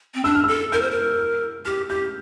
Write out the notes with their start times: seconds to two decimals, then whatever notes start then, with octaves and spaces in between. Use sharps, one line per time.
0.15 C4
0.24 D4 E6
0.35 F6
0.44 E6
0.48 A4
0.72 A#4 G6
0.82 C5
0.91 A#4
1.65 G4 F6
1.89 G4 G6